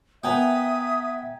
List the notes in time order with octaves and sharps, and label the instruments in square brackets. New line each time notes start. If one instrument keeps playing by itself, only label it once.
[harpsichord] B3 [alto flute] E5 [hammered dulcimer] G5 G#5 A#5 [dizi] D#6